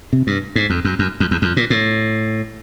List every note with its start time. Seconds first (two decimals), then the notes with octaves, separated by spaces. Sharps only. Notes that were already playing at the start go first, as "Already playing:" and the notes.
0.13 C3
0.27 G2
0.56 G#2
0.70 F2
0.85 F#2
0.99 F#2
1.20 F2
1.31 E2
1.42 F2
1.57 A#2
1.70 A2